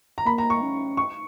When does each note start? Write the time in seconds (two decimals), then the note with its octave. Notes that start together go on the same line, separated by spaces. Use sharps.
0.18 A#5
0.26 A#3 B5
0.38 A#5
0.50 C#6
0.62 C#4
0.97 C#6